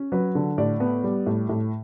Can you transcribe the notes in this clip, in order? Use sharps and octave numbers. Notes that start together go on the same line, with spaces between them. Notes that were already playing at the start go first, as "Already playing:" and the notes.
Already playing: C#4
F#3 B4
D3
A2 D5
B3
G3
A2
A2